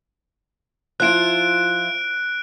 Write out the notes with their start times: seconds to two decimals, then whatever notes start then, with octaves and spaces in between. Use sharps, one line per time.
1.00 F3 E4 F4 F#6 D7